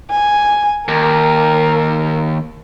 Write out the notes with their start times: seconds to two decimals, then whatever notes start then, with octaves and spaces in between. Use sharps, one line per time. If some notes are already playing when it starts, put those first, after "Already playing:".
0.11 G#5
0.88 D#2 A#4